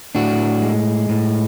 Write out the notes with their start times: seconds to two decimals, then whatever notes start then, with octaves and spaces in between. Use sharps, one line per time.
0.15 A2 D4 F#4
0.62 G#3
1.09 A2